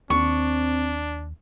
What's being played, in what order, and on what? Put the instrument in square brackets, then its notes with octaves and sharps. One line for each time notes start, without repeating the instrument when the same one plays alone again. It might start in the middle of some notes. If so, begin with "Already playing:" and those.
[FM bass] D#2 [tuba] C4 [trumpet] D4 [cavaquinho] C#6